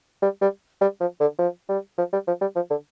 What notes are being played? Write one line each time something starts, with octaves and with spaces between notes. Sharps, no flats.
G3
G3
G3
F3
D3
F3
G3
F3
G3
F3
G3
F3
D3